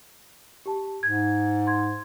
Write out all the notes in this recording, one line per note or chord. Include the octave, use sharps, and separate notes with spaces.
G4 A5
G#2 G#6
C6 G#6